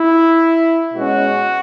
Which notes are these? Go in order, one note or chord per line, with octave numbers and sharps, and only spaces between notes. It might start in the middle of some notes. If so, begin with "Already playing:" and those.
Already playing: E4
B2 G#3 C#4 F#4